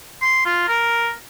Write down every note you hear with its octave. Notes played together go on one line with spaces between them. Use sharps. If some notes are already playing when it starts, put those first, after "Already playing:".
C6
F4
A#4